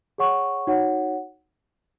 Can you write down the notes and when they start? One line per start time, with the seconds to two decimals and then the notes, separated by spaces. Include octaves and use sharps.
0.18 G#4 C#5 F#5 C#6
0.67 D#4 F#4 C#5 F#5